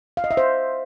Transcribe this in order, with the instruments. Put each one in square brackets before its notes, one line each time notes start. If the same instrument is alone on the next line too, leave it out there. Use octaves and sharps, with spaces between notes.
[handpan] F5
D#5
E5
C5